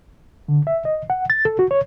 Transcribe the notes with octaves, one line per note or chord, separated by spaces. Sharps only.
D3
E5
D#5
F#5
A6
A4
F#4
C#5